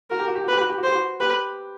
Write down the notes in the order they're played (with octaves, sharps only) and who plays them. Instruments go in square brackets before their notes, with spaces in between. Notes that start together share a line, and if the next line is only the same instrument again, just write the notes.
[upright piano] F#4 [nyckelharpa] A#4
[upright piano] G4
F#4
G4
F#4
[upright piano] G4 [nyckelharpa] B4
[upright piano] F#4
G4
F#4
[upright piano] G4 [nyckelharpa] C5
[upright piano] F#4
[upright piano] G4 [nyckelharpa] B4